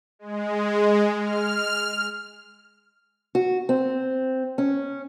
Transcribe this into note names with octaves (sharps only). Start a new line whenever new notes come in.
G#3
F6
F#4
C4
C#4